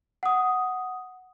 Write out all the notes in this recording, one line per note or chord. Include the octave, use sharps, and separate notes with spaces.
F#5 D#6